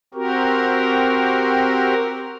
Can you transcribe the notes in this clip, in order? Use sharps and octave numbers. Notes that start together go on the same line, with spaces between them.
C4 F#4 G4 A#4